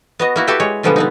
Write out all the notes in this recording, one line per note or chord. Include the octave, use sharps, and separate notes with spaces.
B3 F#4 D#5
A#3 E4 F#4
F#4 G4 A4 B4 E5 G5
G#3 C#5
B2 D3 F3 G3 G#3 B3
B3 C4 D#4